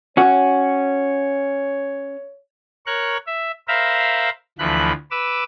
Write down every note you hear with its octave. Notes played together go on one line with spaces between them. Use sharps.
C#4 F#4 C#5
A#4 C#5 C#6 F#6
E5
A#4 C5 E5 F5 A#5 B5
D2 E3 F3 B5 F#6
B4 D6 E6